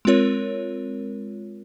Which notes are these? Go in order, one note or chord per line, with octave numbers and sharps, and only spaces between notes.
G#3 C4 F4 A#4 C#5